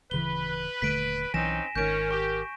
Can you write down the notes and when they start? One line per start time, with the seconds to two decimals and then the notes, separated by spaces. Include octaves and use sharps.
0.11 D1 C#3 E3 B4 G7
0.82 D#1 D3 A3 B6 D7 D#7
1.34 B1 E3 C4 C#4 D#4 G#5 A#6 E7
1.75 G#1 D#3 C#4 A#4 G6 D7
2.11 G4 C#6